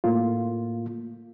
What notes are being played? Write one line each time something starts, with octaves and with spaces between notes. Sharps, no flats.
A2 A3 A#3 F4